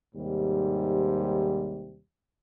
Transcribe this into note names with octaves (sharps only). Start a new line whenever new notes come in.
D#2 G#2 C3 G3